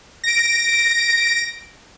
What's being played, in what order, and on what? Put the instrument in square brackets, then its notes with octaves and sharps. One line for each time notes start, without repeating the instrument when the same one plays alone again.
[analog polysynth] A#6 D7